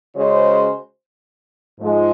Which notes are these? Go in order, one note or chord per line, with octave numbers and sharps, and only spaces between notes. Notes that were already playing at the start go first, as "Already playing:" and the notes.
C#3 G#3 C#4 F#4 C5
G#2 F3 G#3